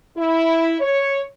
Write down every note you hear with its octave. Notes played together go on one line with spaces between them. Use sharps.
E4
C#5